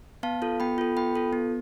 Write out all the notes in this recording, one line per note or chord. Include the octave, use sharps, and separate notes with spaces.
B3 F5 A5
F4 A4
B3 G5 B5
F4 A4
B3 G5 B5
F4 A4
B3